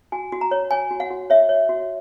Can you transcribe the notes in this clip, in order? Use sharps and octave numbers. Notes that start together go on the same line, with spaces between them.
F#4 G#5
F#4
A#5
C#5
C#5 G#5
F#4
F#5
F#4
C#5 E5
C#5
F#4